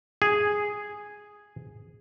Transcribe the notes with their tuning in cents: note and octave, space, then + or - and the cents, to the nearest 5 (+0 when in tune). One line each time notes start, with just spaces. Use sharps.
G#4 -5